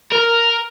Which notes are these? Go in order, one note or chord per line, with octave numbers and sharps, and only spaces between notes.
A#4